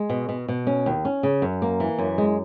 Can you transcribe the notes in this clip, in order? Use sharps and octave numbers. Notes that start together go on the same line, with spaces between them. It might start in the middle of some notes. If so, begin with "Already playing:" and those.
Already playing: G#3
B2
B2
B2
C#4
D#2
C#4
C#3
F#2
A#3
E3
F#2
G#3